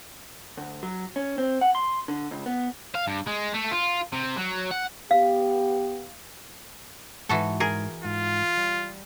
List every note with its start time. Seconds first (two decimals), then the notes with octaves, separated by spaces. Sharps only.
0.57 D2
0.83 F#3
1.16 C#4
1.38 C4
1.61 F#5
1.75 C6
2.08 D3
2.31 C#2
2.46 B3
2.95 F5
3.08 G2
3.27 G#3
3.54 A3
3.71 F4
4.13 C3
4.36 F#3
4.71 F#5
5.11 B3 G4 F5
7.29 G#2 E3 F#4 A4
7.60 G#4 A#4
8.05 G#2 F4
8.57 G3